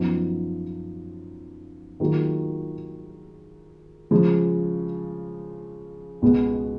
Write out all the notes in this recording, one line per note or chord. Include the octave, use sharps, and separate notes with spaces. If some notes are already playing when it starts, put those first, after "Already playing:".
Already playing: F#2 F3 B3 D#4
D#3 F#3 A#3 F4 G#4
C#3 F3 G#3
C#2 B2 G#3 B3